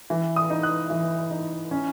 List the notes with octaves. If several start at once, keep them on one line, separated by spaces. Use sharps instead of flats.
E3
D#6
D#4
F#6
E3
D#4
C#4